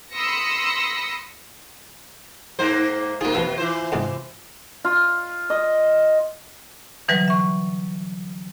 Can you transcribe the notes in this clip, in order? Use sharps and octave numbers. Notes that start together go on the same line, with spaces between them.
B5 C6 D#6 E6 A#6 C#7
G#2 A#3 C5
B2 A#3 D#4 F4 G#4
E2 F3 B4 E5
E3 F4 C5
E2 G#2 C3
F4
D#5
D3 E3 F#3 G3 B4
E5 C#6